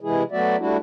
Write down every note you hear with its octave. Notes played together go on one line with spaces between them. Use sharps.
C3 E3 G#3 E4 G#4
F#3 A3 B3 F#4 D5 E5
G3 A3 D4 E4 F#4